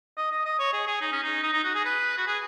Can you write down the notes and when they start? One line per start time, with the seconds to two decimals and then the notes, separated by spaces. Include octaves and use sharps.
0.17 D#5
0.32 D#5
0.45 D#5
0.59 C#5
0.73 G#4
0.87 G#4
1.01 D#4
1.12 C#4
1.23 D#4
1.43 D#4
1.53 D#4
1.64 F#4
1.75 G#4
1.85 B4
2.18 F#4
2.27 G#4